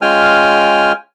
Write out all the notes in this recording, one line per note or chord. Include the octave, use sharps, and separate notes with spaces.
G#3 C#4 F4 G5 G#5 F6